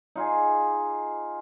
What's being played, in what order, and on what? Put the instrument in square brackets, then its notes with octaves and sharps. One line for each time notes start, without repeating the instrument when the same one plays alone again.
[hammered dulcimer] D#4 F4 G#4